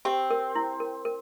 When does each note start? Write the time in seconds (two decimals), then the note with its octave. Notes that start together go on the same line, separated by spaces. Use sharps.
0.05 C4 G4
0.31 A#4
0.55 E4
0.80 A#4
1.05 A#4